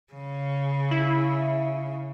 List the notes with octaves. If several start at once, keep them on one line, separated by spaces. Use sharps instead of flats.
C#3
E4